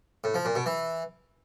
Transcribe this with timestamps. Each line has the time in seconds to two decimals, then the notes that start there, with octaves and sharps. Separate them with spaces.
0.24 A2
0.34 F3
0.45 A#2
0.55 B2
0.66 E3